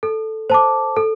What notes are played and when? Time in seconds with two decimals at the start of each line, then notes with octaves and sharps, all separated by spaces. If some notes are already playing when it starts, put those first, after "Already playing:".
0.03 A4
0.50 C5 A5 D6
0.97 A4